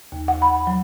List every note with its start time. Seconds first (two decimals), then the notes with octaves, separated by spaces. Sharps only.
0.12 D#2
0.28 F#5
0.42 B5
0.67 F#3